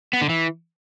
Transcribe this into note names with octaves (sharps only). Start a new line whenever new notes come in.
B3
D3
E3